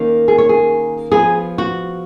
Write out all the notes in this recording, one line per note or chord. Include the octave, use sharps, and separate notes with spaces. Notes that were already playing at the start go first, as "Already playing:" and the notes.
Already playing: D#3 A#3 C#4
G#4
C#5
G#4
F3 B3 G#4
F#4